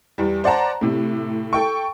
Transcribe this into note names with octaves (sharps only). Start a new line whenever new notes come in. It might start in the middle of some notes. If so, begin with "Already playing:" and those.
E2 G3
C5 D5 F#5 A5 A#5
A2 C3
A4 G5 C#6